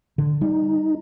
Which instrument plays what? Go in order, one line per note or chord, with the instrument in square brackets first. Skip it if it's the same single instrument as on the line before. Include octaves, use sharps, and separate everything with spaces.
[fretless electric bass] D3
[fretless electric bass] G3 [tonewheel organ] D#4